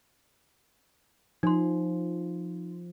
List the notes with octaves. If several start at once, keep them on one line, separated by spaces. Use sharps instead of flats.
F3 D#4 C6